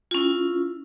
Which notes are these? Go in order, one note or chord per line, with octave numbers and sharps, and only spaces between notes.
C#4 E4 F4